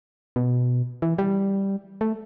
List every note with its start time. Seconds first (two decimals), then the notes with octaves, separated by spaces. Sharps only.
0.36 B2
1.02 E3
1.18 G3
2.01 A3